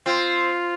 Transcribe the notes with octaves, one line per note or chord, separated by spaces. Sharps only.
C4 F4